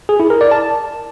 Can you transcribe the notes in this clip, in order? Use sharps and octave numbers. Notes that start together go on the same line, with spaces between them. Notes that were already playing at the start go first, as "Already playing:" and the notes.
G#4
E4
A#4
D5
A5